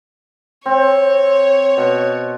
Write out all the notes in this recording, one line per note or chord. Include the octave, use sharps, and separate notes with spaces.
C4 C#5
B2